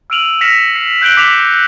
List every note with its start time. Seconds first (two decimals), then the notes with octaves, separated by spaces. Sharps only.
0.10 E6 F6 D7 D#7 F7 F#7
0.41 F6 A#6 B6 C#7 E7 F7
0.76 C7
1.02 F#6 G6 B6 D7 F#7 G7
1.17 D6 B6 D7 E7 F7 G7